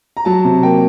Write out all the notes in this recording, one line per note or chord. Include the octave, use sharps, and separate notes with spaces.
A#5
F#3 A5
C3
A#3 G5